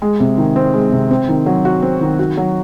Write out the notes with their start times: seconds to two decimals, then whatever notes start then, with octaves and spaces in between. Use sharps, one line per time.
0.02 G#3
0.20 C3
0.38 D#3
0.56 C4
0.74 G#3
0.92 C3
1.11 C4
1.29 D#3
1.46 F#3
1.65 F#4
1.82 C4
2.01 D#3
2.19 F#4
2.37 F#3